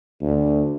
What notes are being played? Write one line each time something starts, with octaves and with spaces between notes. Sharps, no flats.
D2